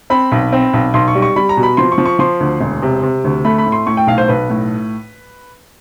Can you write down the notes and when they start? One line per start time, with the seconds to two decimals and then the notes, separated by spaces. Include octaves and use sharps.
0.10 C4 B5
0.32 B1
0.53 C4
0.74 B1
0.94 B1 C6
1.08 C#6
1.15 G3
1.22 C#6
1.36 G3 B5
1.49 A#5
1.57 B2
1.63 B5
1.77 F3 C6
1.92 C#6
1.98 F3
2.06 C#6
2.19 F3 C6
2.40 D2
2.61 E1
2.82 C3
3.03 C3
3.24 D2
3.45 A3 B5
3.58 B5
3.66 A2
3.72 C6
3.87 A2 C#6
3.97 G5
4.07 B1 F5
4.18 C5
4.28 B1 B4
4.50 A2